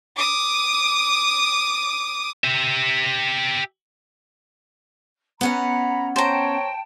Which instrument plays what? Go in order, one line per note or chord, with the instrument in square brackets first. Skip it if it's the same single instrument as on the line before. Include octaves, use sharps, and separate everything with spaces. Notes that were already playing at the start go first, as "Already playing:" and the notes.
[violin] D6 D#6
[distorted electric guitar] G4 E5
[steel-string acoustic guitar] B3 C#4 F#5 [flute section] A#5 [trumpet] B5
[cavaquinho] C5 A#5 [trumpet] C#5 [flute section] G5 A5